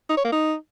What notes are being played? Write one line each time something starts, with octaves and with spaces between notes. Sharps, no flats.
D#4
C#5
A#3
D#4